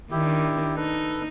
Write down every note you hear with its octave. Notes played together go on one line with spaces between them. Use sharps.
D#3 D4 E4 G4
D#4 A4 B4